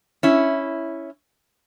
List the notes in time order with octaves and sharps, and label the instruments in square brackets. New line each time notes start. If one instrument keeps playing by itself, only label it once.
[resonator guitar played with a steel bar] C#4 E4